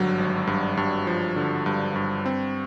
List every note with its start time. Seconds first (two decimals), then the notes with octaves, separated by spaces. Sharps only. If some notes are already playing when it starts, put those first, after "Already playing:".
Already playing: G#1 G2 D3 F#3
0.18 G#1
0.47 G2
0.77 G2
1.07 F3
1.36 D3
1.66 G2
1.96 G2
2.26 C4